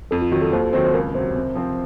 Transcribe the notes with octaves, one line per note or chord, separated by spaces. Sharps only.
F2 A4
F4
D#3 F#3 F#4
A4
D#2 C5
D#3 F#3 C4 C5
C5
C#2 A#4
C3 F#3 C5
C3
F3 C4